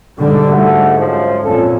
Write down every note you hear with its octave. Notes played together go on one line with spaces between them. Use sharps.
G#2 D3 G3
G#2 A3 D4 F#4
F#2 F3
F2 A#2 C#4 A4